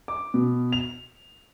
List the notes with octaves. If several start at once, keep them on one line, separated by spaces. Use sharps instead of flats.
D6
B2
F7